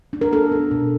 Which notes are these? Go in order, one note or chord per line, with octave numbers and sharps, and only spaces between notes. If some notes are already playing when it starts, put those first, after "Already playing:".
D4
A#4
B3 A4
D4
B2